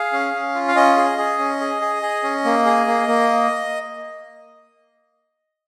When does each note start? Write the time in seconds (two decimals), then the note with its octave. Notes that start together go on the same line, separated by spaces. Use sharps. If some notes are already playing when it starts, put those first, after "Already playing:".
Already playing: G#4 F5
0.13 C#4
0.34 C#4
0.55 F4
0.68 F5
0.76 C#4 D#5
0.97 G#4
1.18 G#4
1.39 C#4
1.61 G#4
1.81 G#4
2.02 G#4
2.23 C#4
2.45 A#3
2.66 G#4
2.87 A#3
3.07 A#3